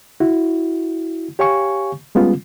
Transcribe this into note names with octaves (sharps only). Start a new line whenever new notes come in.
E4 F#4
G4 C#5 F5 G#5 C#6
G3 G#3 B3 C#4 F4